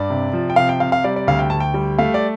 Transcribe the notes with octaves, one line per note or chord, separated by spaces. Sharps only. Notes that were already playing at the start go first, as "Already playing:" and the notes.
Already playing: G2 D5
C3
F3
G5
C3 F5
G5
C3 F5
F5
G3 D5
D5
D2 F5
G5
D2 A5
G5
G3
A3 F5
D5